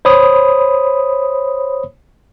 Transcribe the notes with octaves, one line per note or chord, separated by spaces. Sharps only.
C5 C#5 B5 D#6